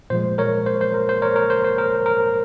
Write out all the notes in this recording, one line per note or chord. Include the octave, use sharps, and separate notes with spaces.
A#2 F3 G#3 C5
A#4 C#5
C5
C5
A#4
C5
A#4 C#5
A#4 C#5
C5
C5
A#4
A#4